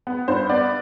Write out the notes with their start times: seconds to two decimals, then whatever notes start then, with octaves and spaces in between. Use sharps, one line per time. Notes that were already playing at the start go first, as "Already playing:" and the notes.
0.07 B3
0.28 G2 C5
0.49 B3 D5